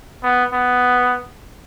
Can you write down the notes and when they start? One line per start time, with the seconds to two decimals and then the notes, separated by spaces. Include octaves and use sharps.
0.23 B3
0.53 B3